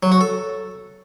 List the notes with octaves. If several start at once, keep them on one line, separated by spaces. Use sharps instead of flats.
F#3
F#4
A4